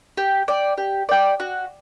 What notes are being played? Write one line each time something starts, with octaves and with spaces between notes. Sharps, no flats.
G4
D5 G5
G4
D5 G5
F#4